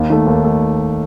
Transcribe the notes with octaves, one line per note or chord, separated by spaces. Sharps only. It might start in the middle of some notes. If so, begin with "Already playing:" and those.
Already playing: D#2
D#3 A3
D#2
A3